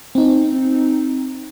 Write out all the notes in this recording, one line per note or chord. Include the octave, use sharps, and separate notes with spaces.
C4 D#4